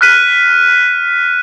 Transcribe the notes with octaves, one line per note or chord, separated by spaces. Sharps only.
F6 F#6 B6 D#7